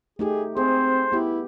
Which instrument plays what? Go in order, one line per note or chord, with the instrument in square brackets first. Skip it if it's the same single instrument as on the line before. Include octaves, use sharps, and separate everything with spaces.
[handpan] A3 D#4 G4 [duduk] G#4
[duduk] C4 [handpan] G#4 [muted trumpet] C5
[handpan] B3 G4 [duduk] E4